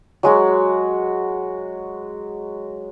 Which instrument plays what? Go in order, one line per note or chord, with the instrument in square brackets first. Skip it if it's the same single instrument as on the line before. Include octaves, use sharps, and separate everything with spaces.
[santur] F#3 G#3 F#4